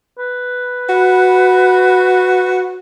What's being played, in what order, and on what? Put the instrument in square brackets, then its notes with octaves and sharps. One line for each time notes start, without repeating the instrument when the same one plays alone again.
[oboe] B4
[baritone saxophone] F#4